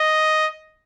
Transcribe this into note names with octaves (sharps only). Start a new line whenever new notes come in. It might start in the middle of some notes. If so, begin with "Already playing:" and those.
Already playing: D#5